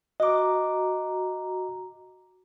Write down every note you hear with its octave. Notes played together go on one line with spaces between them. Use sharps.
F#4 D#5 A#5 D6